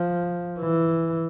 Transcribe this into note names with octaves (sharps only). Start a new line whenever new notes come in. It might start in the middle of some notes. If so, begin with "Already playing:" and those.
Already playing: F3
E3